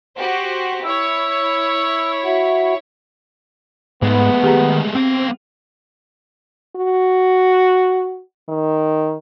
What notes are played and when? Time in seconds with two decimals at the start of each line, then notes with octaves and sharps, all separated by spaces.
0.16 F#4 G4 C5
0.84 E4 C#5 E6
2.25 F#4 E5 F#5
4.02 G#2 G#3 A3 B3
4.43 D#3 G4 G#4 A#5
4.95 B3 C4 F5
6.76 F#4
8.49 D#3